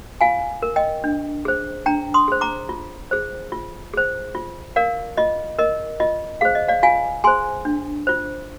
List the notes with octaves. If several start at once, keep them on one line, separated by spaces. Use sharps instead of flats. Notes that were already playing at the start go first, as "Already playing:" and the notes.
F4 F5 G#5
A#4
D#5 G5
D4
G#4 C5
D4 G5 A#5
C6 D#6
G#4 C5
A#5 D6
F4
G#4 C5
F4
G#4 C5
F4
A#4 D5 F5
F4 D#5
A#4 D#5
F4 D#5
G#4 C5 F5
D#5
D5 F5
F4 F5 G#5
G#4 C5 G#5 C6
D4
F4 C5